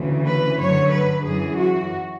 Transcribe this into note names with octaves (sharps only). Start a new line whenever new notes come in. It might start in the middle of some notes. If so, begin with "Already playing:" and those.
Already playing: D2 C#3 E3
B4
F#2 D3 F#3 C#5
B4
F#2 E3 G#4
F#4